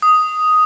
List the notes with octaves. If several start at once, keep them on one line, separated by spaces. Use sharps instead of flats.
D#6